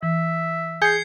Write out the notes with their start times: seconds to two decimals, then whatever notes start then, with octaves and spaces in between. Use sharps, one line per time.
0.03 E3 E5
0.82 G#4 G6 G#6 C7 C#7